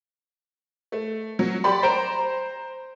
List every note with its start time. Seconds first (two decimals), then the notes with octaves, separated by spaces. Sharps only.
0.92 A3
1.39 F#3
1.64 G4 D5 B5 C6
1.83 C5 A#5 D7